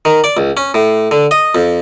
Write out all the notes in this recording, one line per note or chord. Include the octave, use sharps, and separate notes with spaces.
D#3
D5
C#2
C#4
A2
D3
D#5
F2